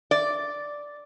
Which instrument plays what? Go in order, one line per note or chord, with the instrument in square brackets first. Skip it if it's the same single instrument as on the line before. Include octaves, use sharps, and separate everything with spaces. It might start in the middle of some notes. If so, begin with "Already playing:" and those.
[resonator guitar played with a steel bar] D5